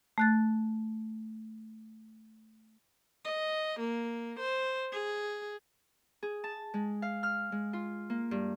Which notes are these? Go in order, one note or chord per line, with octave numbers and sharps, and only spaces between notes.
A3 F#6 A6
D#5
A#3
C5
G#4
G#4
A5
G#3
F5
F6
G#3
F4
A#3
G2